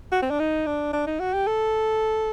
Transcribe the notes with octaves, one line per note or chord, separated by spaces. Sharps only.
F#4
C4
D4
D#4
D4
D4
D#4
F#4
G4
A4